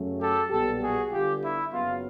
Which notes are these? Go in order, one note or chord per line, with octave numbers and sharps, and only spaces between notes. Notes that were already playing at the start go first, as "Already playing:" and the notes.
Already playing: F#2 C#3 F#3 A3 C#4
G4 A4
B1 A#2 G3 B3 G4 A4
F#4 G#4
G1 G2 D3 F4 G4
E4
F#1 F#2 C#3 F#3 B3 F4